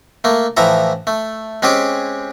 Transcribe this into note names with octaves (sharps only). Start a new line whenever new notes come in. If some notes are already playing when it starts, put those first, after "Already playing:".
A3 A#3
A2 E3 F3 E5 A#5
A3
G#3 C4 C#4 G4 G#4